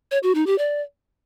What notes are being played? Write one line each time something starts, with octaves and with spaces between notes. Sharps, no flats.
C#5
F#4
D#4
G4
D5